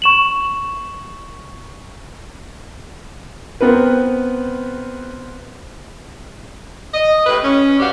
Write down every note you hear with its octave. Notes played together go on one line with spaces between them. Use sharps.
C#6 E7 F#7
B3 C4 A#4 B4
D#5
A2 G4 B4
C#4
G2 F#4 G4 D5 F5